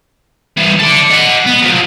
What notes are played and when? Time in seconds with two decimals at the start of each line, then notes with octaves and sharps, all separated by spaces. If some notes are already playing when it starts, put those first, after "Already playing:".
0.57 E3 G3
0.79 A4 D5
1.10 D#5 F#5
1.46 B3
1.62 F3 F#3